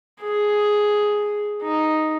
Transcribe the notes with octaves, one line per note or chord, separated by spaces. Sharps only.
G#4
D#4